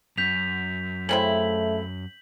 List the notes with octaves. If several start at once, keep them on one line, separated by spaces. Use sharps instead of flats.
F#2 G6 B6 F7
C#3 A3 C4 E4 F#7